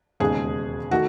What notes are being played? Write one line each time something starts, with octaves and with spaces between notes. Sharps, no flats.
E1 D#2 C#3 G#3 G#4
D#3 A3 F#4